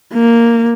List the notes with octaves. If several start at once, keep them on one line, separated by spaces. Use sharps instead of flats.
A#3